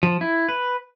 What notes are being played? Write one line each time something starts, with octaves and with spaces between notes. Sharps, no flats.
F3
E4
B4